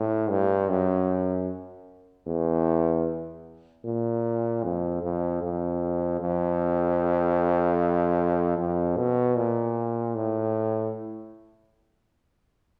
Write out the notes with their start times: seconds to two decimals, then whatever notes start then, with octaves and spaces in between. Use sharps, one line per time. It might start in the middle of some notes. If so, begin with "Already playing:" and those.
Already playing: A2
0.30 G2
0.69 F#2
2.27 E2
3.85 A#2
4.63 F2
5.03 F2
5.42 F2
6.21 F2
8.58 F2
8.97 B2
9.36 A#2
10.15 A2